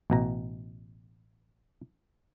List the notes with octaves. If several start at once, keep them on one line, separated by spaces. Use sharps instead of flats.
A1 B2 A#5